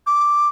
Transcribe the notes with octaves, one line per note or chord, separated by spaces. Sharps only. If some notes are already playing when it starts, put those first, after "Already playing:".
D6